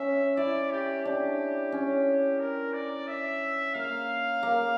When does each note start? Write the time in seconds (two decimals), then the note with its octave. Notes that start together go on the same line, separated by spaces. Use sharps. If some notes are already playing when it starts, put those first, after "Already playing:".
Already playing: C#4 E5
0.37 E4 D5
0.71 G4
1.04 D4 G4
1.72 C#4
2.40 A#4
2.74 D5
3.08 E5
3.75 A#3 F5
4.43 A#3